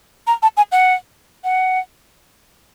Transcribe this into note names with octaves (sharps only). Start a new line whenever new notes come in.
A#5
A5
G#5
F#5
F#5